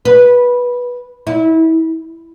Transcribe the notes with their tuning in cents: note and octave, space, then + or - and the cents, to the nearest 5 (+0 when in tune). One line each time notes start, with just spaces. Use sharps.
B4 -15
E4 -30